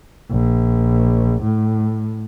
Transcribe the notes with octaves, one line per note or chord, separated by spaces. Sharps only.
A#1
A2